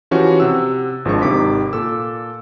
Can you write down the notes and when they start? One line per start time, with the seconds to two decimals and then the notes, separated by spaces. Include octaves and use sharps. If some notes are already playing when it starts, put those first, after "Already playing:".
0.11 E3 F3 C#4 F#4 G4
0.40 C3 F#5 E6
1.05 G#1 F3 G#3 D4 C#6
1.22 G#1 C3 D#3 D6 B6
1.73 A#2 A4 E6